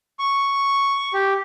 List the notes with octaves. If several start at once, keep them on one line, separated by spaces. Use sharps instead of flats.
C#6
G4